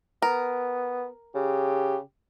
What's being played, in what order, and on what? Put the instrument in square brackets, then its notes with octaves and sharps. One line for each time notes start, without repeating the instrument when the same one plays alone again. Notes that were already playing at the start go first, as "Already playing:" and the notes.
[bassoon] B3 [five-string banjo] A#4
[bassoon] C#3 [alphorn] G4